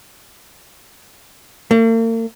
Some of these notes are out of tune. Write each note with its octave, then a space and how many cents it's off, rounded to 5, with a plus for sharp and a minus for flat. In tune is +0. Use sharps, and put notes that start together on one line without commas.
A#3 -45